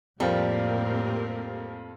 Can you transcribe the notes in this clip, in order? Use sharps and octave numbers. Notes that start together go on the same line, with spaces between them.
F2 A2 F3 G3 A#3 C4 G4 A#4